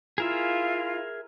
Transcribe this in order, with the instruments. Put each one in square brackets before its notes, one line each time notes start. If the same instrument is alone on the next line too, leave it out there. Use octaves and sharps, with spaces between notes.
[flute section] E4 F4 F5 [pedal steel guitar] G#4 A#4 E5